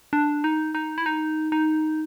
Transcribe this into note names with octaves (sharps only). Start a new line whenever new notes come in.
D4
D#4
D#4
E4
D#4
D#4